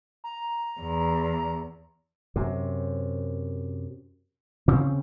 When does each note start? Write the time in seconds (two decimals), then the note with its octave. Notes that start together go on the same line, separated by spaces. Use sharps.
0.24 A#5
0.79 E2
2.36 F#2 C3
4.68 C#3 C4 C#4